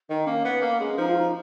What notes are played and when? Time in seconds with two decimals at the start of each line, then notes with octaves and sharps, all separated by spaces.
0.10 D#3 D#4
0.27 A#3 C#4
0.45 B3
0.62 A#3
0.80 G#3
0.98 F3 D#4
1.08 F4
1.17 D#4